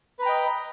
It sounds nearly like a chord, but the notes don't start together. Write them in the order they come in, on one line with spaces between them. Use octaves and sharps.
B4 A#5 G5 D#5